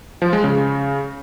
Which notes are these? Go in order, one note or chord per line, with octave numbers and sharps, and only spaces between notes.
F3
G#3
C#3